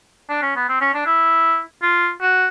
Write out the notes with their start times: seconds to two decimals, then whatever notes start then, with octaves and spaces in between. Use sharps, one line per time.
0.29 D4
0.42 C#4
0.56 B3
0.69 C4
0.81 C#4
0.94 D4
1.06 E4
1.82 F4
2.21 F#4